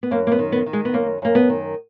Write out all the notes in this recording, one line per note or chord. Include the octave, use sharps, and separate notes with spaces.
B3
F#2 A#3
A#3
B3
D#3
B3
D#3
G#3
B3
F#2 A#3
F#2 A#3
B3
D#3